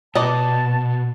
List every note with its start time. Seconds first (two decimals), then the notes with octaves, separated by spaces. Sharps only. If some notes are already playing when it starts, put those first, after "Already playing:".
0.15 B2 B4 D5 D#5 A5